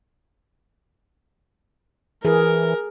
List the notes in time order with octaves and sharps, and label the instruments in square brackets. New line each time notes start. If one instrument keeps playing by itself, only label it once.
[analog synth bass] E3 [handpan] G#4 [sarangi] A#4